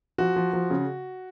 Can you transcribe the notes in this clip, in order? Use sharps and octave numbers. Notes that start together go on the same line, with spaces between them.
F3 F#4
F3
F3
C#3